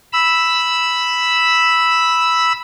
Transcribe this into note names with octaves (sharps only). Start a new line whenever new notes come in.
B5 E6